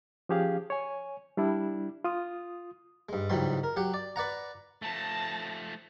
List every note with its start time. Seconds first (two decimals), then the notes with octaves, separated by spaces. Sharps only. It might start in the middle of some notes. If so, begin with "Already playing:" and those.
0.29 F3 C#4 G4 G#4 F5
0.70 C#5 G#5
1.37 G3 D4 E4
2.04 F4 D#6
3.09 G2 G#3
3.30 C#2 G#2 E3 F#3 G3 C6
3.64 A#4
3.76 F#3 G4 F#5
3.94 D5
4.16 B4 D5 F#5 A#5
4.82 F3 A3 A5 A#6